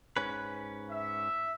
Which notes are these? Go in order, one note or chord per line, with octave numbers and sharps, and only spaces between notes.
G#2 C#4 B4
E5